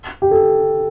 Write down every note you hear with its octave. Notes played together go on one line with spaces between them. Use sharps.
G4
A4